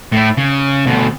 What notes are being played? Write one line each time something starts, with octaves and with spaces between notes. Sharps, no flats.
A2 E4
C#3
D2 B2